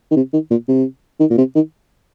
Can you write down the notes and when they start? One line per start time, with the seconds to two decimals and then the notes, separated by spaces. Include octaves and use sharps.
0.11 D#3
0.16 C3
0.33 D#3
0.51 A#2
0.68 C3
1.20 D#3
1.30 A#2
1.38 C3
1.55 D#3